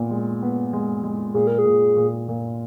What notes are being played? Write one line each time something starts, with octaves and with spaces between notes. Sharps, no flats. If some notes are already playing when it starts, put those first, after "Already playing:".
Already playing: A#2 B3
G#3
B3
G#3
G#3
A#2 G#4
A#4
G#4
A#2
A#2
A#2